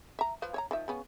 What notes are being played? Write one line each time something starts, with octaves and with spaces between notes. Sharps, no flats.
E5 A#5
F3 B4 F5
C#5 E5 A#5
D#3 F3 E5
C#3 B3 C#4